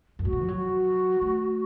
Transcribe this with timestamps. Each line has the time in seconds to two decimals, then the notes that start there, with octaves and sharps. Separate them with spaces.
0.19 F#2
0.24 A2 F#4
0.33 A#2
0.41 F3
0.48 F#3
0.57 F#4
1.22 A3